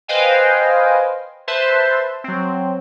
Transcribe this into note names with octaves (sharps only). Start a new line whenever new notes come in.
B4 C5 D#5 F5 G5 G#5
B4 C5 E5 A5 C6
F#3 C4